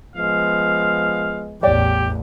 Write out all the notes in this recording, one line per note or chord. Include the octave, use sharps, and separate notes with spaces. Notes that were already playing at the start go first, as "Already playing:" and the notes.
F3 G#3 B3 F5
A1 E2 G4 C#5 D5 G5